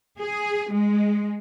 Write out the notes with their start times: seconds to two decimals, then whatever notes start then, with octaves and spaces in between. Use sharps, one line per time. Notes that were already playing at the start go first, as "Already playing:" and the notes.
0.19 G#4
0.72 G#3